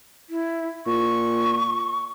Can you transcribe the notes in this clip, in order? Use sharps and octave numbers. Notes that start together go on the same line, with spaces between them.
E4
A#2 C#6